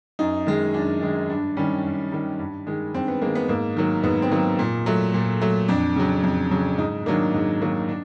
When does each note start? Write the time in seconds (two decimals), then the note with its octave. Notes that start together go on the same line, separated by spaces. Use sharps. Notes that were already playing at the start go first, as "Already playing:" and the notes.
0.19 F#2 D#4
0.47 D#3 G#3
0.74 F#2 D4
1.01 D#3 G#3
1.29 G2 D4
1.57 D#3 G3 C#4
1.84 G2
2.12 D#3 G3
2.39 G2
2.67 D#3 G#3
2.94 G2 C4
3.08 B3
3.22 G#3 A#3
3.26 D#3
3.35 B3
3.49 G#2 A#3
3.77 D#3 F#3 A#3
4.03 G#2 B3
4.22 C4
4.31 D#3 F#3 A#3
4.59 A#2
4.86 F#3 A3
5.14 A#2
5.41 F#3 A3
5.68 F2 D4
5.96 C#3 F#3
6.23 F2
6.51 C#3 F#3
6.78 G#2 D#4
7.06 D#3 F#3 A#3 D4
7.34 G#2
7.62 D#3 F#3 A#3
7.89 D4